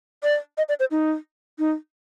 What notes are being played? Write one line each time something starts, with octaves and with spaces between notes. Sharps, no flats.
D5
D#5
D5
C5
D#4
D#4